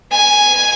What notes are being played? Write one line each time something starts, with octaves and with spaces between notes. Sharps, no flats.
G#5